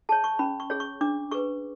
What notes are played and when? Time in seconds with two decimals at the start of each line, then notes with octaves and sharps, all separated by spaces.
0.09 G#4 C#5 A5
0.24 C#6
0.39 C#4 B5
0.60 C#6
0.70 G#4 C#5
0.80 C#6
1.01 D4 D6
1.31 G#4 B4 C#6